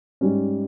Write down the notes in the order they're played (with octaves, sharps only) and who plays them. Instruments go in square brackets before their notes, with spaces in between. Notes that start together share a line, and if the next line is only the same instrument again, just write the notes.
[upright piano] G#2 G3 C#4